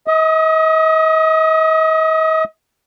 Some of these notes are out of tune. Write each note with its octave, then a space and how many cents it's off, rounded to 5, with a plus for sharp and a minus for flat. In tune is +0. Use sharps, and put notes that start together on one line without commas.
D#5 +40 D#6 +0